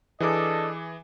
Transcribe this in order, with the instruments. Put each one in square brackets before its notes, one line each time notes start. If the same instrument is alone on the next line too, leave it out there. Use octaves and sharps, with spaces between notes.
[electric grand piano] E3 G#4 D6 [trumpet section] D4 A4 D#5